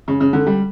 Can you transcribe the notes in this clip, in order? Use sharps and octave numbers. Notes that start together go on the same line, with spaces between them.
C#3
C#3
D3
G3